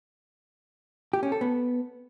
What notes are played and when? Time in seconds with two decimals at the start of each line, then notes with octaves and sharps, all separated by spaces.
1.13 G4
1.23 C#4
1.32 A4
1.41 B3